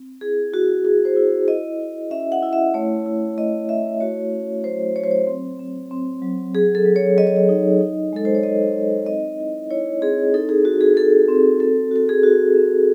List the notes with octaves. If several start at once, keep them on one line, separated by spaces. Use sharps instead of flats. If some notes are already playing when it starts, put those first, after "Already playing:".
Already playing: C4
E4 G#4
E4 F#4
E4 G#4
C5
E4
E4 D#5
E4
C#4 E5
F#5
E4
E5
A3 C#5
E4
A3 D#5
E4 E5
F#4 C#5
C#4
F#3 C5
F#3 C#5
C5
C#5
C4
C4
C4
F#3
F#3 G#4
A4
F#3
C#5
F#3 D#5
C#5
D#5
D#4
D#4
G#3 A4
C5
C#5
G#3 D#5
D#4
C4 D#5
E4
E4 C#5
C4 G#4
D#4 A4
G#4
F#4
G#4
F#4 A4
C4
C4 A4
F#4 A4
G#4
F#4
C4